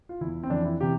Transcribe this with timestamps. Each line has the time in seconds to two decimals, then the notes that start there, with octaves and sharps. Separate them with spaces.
0.09 F4
0.21 E2 E3 E4
0.43 C4
0.50 F2 E3 D4
0.65 E4
0.81 C3 E3 G4